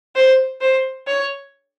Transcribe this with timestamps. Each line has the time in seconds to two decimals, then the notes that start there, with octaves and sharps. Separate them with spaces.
0.16 C5
0.61 C5
1.07 C#5